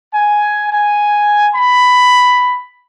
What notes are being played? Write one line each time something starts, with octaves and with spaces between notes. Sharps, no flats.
G#5
G#5
B5